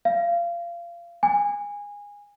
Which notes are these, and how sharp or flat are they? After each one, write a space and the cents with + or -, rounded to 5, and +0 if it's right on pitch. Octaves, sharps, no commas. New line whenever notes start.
F5 -25
G#5 -20